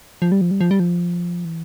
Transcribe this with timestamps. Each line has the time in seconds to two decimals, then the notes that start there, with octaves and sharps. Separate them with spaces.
0.22 F3
0.32 G3
0.41 F3
0.51 G3
0.61 F3
0.71 G3
0.80 F3
1.45 E3